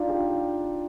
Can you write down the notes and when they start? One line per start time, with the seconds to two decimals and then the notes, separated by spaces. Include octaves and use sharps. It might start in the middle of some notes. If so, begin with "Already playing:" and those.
Already playing: D4 D#4 F4
0.09 G4